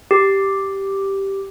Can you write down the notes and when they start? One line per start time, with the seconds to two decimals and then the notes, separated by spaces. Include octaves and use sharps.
0.11 G4